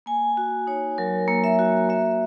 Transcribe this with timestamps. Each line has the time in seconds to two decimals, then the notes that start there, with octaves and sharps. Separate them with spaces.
0.06 A#3 G#5
0.37 F#4
0.67 D#4 C#5
0.98 F#3 A#4
1.28 A#3
1.44 E5
1.59 F#4
1.89 A#3 E5